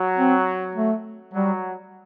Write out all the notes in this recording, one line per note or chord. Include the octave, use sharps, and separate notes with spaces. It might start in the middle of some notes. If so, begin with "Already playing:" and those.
Already playing: F#3
C4
A3
F#3 G3